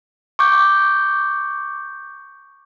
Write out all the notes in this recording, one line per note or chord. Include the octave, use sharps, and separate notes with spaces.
C#6 D6 G6